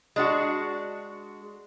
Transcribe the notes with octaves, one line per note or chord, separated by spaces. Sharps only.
G#3 D4 F#4